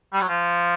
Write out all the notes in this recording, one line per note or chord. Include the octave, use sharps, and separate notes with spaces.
G3
F#3
F3